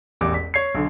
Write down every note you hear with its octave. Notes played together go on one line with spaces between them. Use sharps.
E1 A1 E2 G4 D6
B6
C#5 G#6 C7
B1 D3